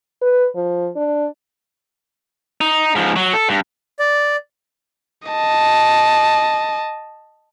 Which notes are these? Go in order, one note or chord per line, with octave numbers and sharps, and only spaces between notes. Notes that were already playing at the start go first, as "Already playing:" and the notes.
B4
F3
D4
D#4
G#2 F3
F#3
A4
G2
D5
D#5 A5